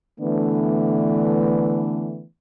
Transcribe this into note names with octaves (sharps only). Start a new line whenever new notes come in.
D3 E3 A3 B3 D4